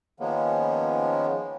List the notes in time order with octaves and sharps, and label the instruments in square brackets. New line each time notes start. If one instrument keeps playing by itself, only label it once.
[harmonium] D#3 F3 G#3 A#3 B3 C#4